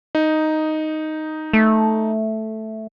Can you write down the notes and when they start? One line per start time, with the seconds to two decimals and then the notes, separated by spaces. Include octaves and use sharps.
0.15 D#4
1.53 A3